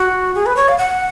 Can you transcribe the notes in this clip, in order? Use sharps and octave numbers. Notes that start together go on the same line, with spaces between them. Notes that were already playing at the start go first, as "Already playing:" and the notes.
Already playing: F#4
G#4
B4
C#5
F5
F#5